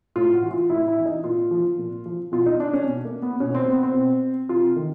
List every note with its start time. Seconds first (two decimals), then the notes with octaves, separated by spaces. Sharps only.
0.16 A2 F4
0.34 F#4
0.42 E3
0.51 F4
0.69 A2 E4
0.88 E4
0.97 E3
1.06 D#4
1.24 A#2 F4
1.51 F3
1.78 A#2
2.06 F3
2.32 B2 F4
2.46 D#4
2.60 D4
2.73 C#4
2.86 B2
3.05 A#3
3.22 B3
3.40 B2 C#4
3.55 C4
3.69 B3
3.83 C4
3.95 B2
4.49 C3 F4
4.76 D#3